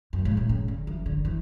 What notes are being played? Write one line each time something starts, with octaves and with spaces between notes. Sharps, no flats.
F#2
G#2
A2
C#3
D3
E3
D3
E3